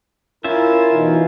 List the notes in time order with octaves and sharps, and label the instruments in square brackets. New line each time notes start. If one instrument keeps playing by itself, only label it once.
[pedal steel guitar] C#4 F4 E5 [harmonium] E4 A#4
[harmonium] B2 E3 D#4